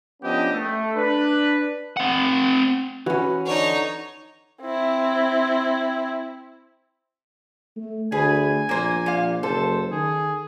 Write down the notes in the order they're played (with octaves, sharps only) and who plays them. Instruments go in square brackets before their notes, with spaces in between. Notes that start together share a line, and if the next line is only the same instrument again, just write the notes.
[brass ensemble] F3 B3 C#4 D4 G4 D#5
A3
D4 B4
[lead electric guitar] C4 F#5
[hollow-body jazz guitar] E3 C#4 [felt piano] F#4 [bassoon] B4
[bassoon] D3 [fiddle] D#4 C#5
[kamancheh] C4 E4
[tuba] A3
[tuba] D2 [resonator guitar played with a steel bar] G#4 B4 [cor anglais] G#5
[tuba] A#1 [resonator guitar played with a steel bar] A#3 C5
[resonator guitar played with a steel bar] A#2 F5
[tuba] F#1 [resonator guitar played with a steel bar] A4 [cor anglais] C5
[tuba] D#3 [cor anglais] G#4